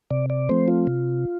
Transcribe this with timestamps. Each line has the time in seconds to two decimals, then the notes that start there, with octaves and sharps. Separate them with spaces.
0.11 C3 D5
0.30 D5
0.49 F3 A3 C4 C5
0.68 F4
0.87 C3